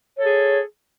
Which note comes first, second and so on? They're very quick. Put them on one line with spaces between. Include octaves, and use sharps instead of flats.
C#5 A4 G#4